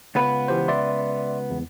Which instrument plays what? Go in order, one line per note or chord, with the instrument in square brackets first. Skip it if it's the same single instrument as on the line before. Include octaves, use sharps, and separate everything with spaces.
[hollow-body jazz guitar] C#2 B3 B4
[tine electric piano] E3 G4 C5
D5 E5 C6
E2